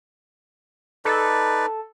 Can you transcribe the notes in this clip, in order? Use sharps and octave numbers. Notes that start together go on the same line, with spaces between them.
D#4 A4 B4 D5